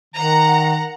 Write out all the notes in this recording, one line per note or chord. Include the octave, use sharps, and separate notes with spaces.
D#3 F#5 A#5